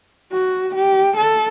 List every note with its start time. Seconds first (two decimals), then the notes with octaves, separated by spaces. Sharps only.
0.32 F#4
0.75 G4
1.17 A4